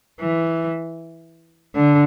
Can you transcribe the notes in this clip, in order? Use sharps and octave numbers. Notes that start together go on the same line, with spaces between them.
E3
D3